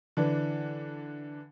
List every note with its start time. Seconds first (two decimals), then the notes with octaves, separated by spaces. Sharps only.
0.17 D3 E3 D4